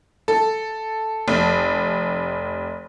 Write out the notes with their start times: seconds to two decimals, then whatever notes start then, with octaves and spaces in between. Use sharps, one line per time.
0.28 A4
1.28 F1